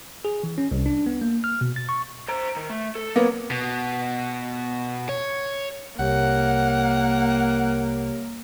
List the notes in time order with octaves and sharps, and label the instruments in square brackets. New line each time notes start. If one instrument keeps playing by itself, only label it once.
[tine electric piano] G#4
E3
C#4
C2
D4
B3
A#3
F6
B2
A6
C#6
[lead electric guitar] C5 A#5
D#3
A3
A4
[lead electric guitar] F#3 [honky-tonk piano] A#3 B3
[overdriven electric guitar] B2
C#5
[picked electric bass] C2 [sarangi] A#3 [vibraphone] G4 A#4 C#5 [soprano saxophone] F#5